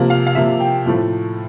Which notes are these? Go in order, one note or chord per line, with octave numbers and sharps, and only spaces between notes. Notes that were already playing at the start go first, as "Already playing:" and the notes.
Already playing: C3 F3 A#3
F5
F5
C3 F3 A#3 E5
G5
A2 F3 A3